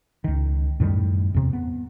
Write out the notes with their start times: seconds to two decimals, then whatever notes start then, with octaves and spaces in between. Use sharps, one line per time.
0.24 C#2 D#3
0.80 F#2 A2 D#3 G3
1.34 E2 C3
1.53 B3